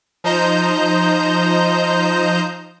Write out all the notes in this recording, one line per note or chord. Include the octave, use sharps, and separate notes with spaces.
F3 D#4 C5 D#5 A#5 G6